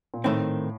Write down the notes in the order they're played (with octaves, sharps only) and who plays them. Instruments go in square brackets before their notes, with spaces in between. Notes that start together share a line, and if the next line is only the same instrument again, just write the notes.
[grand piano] A#2
[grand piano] A2 [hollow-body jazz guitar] D#3 A3 C4